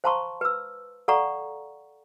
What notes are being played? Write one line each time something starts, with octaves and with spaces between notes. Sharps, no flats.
C5 F5 A5 A#5 C6 C#6
B4 E6
A4 D5 F5 F#5 A#5 C#6